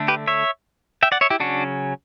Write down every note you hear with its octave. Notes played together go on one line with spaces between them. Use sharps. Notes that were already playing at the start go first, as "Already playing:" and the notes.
Already playing: D3 A3 D4
G4 B4
C#5 E5
E5 G5
D5 F#5
C#5 E5
E4 G4
C#3 F#3 C#4 D4 F#4